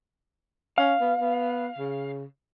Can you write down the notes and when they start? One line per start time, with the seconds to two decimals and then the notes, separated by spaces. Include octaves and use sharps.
0.78 C#4 F5
1.01 B3
1.20 B3
1.79 C#3